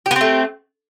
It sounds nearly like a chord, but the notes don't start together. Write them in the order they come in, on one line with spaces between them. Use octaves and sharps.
G4 B3 C4 A3